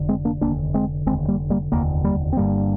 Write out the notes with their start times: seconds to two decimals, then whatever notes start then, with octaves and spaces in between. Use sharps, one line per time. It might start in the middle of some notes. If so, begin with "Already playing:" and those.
Already playing: F1 D3
0.09 G#3 C4
0.25 A#3 D4
0.41 F1 D#2 D3 A#3 D4
0.74 G#3 C4
1.06 F1 D#2 D3 G#3 C4
1.28 G3 A#3
1.50 G3 A#3
1.72 F1 D#2 D3 A#3
2.04 G3 A#3
2.33 C4
2.37 G1 G2 D3 G3 A#3